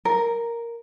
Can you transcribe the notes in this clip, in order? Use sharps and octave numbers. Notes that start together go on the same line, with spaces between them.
A#4